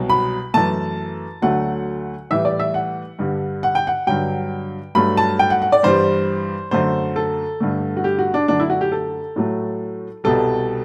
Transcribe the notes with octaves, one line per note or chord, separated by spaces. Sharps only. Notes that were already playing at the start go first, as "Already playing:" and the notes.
Already playing: C2 B2 F#3
B5
F#2 E3 A3 A5
D2 D3 F#3 A3 F#5
A2 E3 G3 E5
D5
E5
F#5
G2 D3 G3
F#5
G5
F#5
G2 D3 F#3 G5
G2 F#3 A3 B5
A5
G5
F#5
F#5
D5
G2 E3 G3 C5
F#2 D3 A3 C5
A4
G2 D3 A3
F#4
G4
F#4
D4
F#2 D3 A3 D4
E4
F#4
G4
A4
A2 F#3 A3
C2 B2 G3 A4